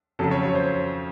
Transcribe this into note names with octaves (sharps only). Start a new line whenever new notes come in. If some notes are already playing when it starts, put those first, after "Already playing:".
F2 C#3 F#3 A4
C#5
C#5
C5